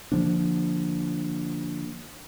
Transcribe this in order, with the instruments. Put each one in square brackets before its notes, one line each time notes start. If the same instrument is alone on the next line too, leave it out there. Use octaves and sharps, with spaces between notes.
[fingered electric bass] D3 F3 A#3 D4